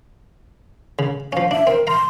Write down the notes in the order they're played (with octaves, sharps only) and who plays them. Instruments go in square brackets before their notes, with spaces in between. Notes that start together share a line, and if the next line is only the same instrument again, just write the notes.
[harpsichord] C#3
[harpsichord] F3 C#4 [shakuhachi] F5
[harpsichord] D4 [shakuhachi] E5
[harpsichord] C4 [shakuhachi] A#4
[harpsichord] F5 A#5 [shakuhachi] C6